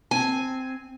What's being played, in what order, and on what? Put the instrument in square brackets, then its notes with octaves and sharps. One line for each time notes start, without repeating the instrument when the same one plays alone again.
[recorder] C4 [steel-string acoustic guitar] G#5